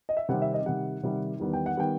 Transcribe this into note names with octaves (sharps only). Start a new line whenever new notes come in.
D#5
E5
C3 D#3 G3 C4 F#5
E5
D#5
C3 D#3 G3 F#5
C3 D#3 G3
E2 D#3 G3 B3
G5
F#5
D#3 G3 B3 G5